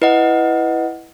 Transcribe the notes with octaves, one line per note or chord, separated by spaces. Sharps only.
E4 B4 D#5 F#5